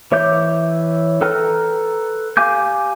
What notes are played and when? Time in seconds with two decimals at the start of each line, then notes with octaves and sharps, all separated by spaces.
0.12 E3 C#5 E5 D6 G6
1.21 A4 B4 G5 A#5 F6
2.37 G4 F5 G#5 D6 G6